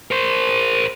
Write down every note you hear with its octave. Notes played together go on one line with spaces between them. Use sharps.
A#4 C5